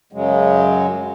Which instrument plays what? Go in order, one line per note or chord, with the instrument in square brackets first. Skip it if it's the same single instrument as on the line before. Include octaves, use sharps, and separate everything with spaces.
[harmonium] F#2 C#3 F#3 G#3